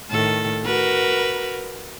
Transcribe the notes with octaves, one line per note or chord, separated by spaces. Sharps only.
A2 D#3 A4
F#4 A#4 B4